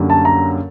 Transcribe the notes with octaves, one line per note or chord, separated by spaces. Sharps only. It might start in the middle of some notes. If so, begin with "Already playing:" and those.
Already playing: F#2 D3 G3 A#3
A5
A#5